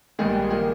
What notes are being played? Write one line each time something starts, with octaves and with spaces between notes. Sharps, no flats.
A#1 G#2 D#3 G3 G#4
G4
F3 A#3 G#4